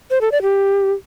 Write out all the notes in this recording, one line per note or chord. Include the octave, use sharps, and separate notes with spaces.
C5
A4
D5
G4